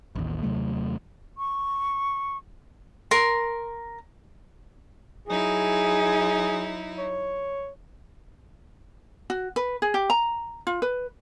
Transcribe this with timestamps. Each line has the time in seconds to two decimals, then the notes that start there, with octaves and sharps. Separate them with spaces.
0.15 A1 D#2
0.43 D#2 C3 F#3 A3
1.38 C#6
3.11 A#4 C6
5.28 F#3 D#4 E4 G#4
6.98 C#5
9.30 F#4
9.56 B4
9.82 G#4
9.94 G4
10.10 A#5
10.67 F4
10.82 B4